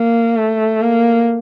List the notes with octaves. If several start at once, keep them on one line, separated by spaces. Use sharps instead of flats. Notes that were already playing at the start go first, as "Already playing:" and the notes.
Already playing: A#3
A3
A#3